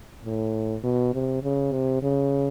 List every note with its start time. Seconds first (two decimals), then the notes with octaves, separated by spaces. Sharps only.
0.25 A2
0.84 B2
1.14 C3
1.43 C#3
1.72 C3
2.02 C#3